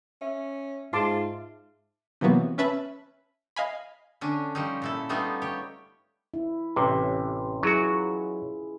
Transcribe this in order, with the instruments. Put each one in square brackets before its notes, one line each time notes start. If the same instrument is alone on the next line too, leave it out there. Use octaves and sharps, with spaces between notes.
[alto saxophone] C#4 [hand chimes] E5
[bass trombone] G#2 [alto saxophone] F4 [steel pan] A5 C6 D6
[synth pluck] C3 E3 F#3 A#3 B3 F#4
C#4 B4 E5 A5 B5
D#5 F5 G#5 B5
[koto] D3 C#4 D4
F3 G3 C#4 D#4
A#2 E4 A4
G3 A3 B3 D#4 F4
G4 C#5
[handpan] E4
[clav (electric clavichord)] A1 C3 [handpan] C#4 B4
[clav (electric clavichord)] F#3 F#4 [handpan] E4 G#4
[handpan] F4